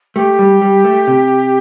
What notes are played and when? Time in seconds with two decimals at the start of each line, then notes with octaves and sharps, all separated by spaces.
0.15 A3 G4
0.39 G3
0.62 G3
0.85 A3
1.07 C3